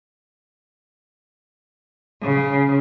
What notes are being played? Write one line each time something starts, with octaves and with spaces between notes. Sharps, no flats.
C#3